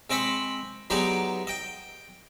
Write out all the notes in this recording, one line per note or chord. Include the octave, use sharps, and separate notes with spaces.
G#3 C4 D#5 B5 C#6
F#3 G#3 B3 D#4 G4 D5
D#5 G5